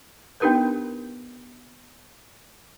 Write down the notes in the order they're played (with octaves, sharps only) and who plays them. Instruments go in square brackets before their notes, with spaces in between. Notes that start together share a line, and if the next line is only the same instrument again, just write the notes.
[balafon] B3 D4 D#4 G4 A#4 B4